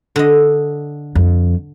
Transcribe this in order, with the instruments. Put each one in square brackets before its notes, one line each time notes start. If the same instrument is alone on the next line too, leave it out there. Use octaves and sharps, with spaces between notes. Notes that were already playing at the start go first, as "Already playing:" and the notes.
[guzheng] D3 D#5
[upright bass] F2